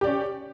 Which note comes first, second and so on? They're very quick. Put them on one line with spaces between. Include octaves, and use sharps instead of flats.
G4 D5 C#4